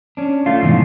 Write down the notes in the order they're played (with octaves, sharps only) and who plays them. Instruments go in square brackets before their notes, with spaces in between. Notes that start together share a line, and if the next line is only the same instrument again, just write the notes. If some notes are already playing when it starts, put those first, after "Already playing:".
[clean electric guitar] C#4 D4
[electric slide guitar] A3 F4
[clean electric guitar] G#2 D3 E3 [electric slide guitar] B2 F3